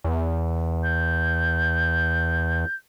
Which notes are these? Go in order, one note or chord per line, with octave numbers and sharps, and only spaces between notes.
E2
G6